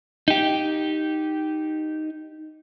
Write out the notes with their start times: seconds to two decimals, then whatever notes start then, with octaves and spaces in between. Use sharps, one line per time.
0.28 D#4 G4